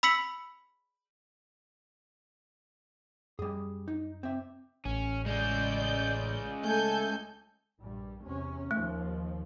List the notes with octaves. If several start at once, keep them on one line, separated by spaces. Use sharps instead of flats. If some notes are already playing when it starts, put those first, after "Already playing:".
B5 E6 B6 C#7 F#7
F#2 G3 G#4
D#4
C4 E5
A1 C#4
G#3 C#4 D5 G6
A3 A4 G#5 G6
A#1 G2 G3
E2 C3 C#4
D#2 F3 A3